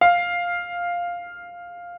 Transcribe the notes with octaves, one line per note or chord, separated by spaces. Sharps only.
F5